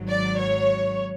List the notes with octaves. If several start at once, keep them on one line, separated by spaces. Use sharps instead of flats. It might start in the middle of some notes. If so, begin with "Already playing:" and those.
Already playing: G#1 G#2 F#3
D5
C#5